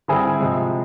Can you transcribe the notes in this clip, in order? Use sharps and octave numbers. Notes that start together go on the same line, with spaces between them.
D3 G3 C4 E4 G#4
C3 F3 G#3